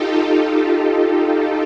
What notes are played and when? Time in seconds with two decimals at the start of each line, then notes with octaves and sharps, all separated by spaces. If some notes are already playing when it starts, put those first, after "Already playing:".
Already playing: D#4 F4 G4 A4
0.19 F4 A4